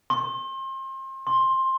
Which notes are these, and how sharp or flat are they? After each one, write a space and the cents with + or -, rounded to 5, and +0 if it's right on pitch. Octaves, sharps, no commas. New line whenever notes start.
C6 +35
C6 +15